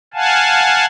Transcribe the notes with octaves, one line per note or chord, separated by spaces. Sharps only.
F5 F#5 G#5 A5